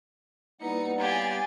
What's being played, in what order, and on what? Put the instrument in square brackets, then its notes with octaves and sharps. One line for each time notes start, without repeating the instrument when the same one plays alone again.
[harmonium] G3 B3 [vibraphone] A#3 E4 B4 [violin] D#4 C#7
[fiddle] G4 G#4 [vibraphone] C#5 F5 F#5 [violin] G#5 A6